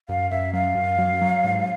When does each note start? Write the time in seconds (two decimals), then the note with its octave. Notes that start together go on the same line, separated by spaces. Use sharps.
0.09 F#2 F5
0.31 F#2 E5
0.53 F#3 F5
0.75 F#2
0.98 F#3
1.21 F#3
1.44 G#2